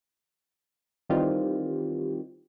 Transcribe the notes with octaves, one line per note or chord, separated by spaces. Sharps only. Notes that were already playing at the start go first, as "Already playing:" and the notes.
D#3 E3 G3 C4 F4 G4